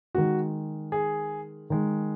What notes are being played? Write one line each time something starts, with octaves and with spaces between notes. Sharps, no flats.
D#3 G#3 F#4
G#4
D#3 G#3